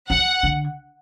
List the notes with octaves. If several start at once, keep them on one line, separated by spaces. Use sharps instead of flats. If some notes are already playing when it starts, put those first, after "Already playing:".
F#3 F#5
D3